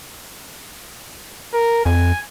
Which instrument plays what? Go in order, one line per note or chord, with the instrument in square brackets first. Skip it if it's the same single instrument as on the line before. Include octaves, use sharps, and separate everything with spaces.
[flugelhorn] A#4
[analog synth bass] F2 [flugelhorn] G#5